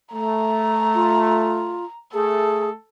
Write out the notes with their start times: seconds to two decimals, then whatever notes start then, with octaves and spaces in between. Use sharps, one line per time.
0.13 A3 A#5
0.95 F4
2.14 A3 G#4 A4